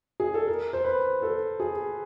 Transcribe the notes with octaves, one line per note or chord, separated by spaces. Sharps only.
G#4
A4
A#4
C5
B4
A4
G#4